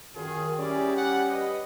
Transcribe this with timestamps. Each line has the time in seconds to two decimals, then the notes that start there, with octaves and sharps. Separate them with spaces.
0.16 F#2 D#3 F4 G#4
0.58 G3 C#4 E4 G4 G#4 D5
0.95 F#5
1.29 B4 D#5